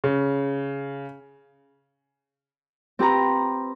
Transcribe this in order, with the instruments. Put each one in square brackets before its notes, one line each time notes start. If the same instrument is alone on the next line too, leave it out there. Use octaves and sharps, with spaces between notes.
[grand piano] C#3
[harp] C4 G4 B4 A#5